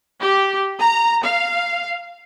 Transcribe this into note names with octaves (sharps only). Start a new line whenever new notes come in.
G4
A#5
F5